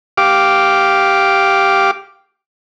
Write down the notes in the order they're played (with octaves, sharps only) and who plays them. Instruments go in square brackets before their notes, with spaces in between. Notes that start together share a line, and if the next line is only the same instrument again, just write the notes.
[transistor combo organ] G4 F5 D6